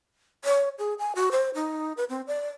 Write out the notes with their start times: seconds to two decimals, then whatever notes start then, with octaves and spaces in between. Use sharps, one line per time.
0.45 C#5
0.78 G#4
0.99 G#5
1.15 F#4
1.32 C5
1.55 D#4
1.97 B4
2.09 C4
2.27 D5